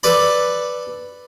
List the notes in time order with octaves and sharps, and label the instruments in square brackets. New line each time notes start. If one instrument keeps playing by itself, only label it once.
[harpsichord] A4 B4 D5 B5